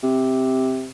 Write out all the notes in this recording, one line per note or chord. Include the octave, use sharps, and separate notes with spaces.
C3